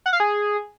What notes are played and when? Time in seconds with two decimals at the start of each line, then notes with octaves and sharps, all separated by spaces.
0.06 F#5
0.13 F5
0.20 G#4